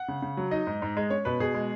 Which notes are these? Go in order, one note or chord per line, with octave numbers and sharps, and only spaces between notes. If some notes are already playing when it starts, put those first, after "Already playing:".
Already playing: F#5
C#3
C#3
F#3
D#4 D#5
G#2
G#2
G#3
C#4 C#5
B2 B4
B2 G#4
G#3